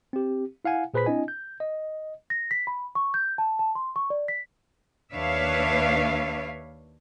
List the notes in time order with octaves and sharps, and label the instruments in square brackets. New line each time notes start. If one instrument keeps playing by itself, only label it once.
[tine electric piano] C4 G4
E4 F5 F#5 G#5
A#2 G#4 B4 C5 B5 B6
C4 D4 E4 D#5 G#5
G6
D#5
[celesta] A#6
B6
B5
C#6
G6
A5
A5
C6
C#6
D5
B6
[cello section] D#2 D4 B4 C#5 E5 F5